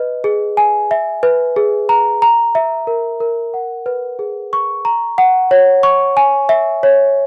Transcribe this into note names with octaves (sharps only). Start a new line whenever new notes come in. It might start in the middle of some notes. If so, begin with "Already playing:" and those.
Already playing: B4 D#5
G#4
G#5
E5
B4
G#4
A#5
A#5
E5
A#4
A#4
F#5
B4
G#4
C#6
A#5
F#5
C#5
C#6
G#5
E5
C#5